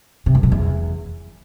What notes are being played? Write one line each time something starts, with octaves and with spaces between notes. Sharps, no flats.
C3
F#2
B2
E2